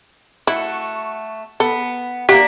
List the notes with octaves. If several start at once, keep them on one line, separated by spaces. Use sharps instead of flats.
A3 E4 F#4
B3 A4
A#3 D4 G4 E5 F#5 B6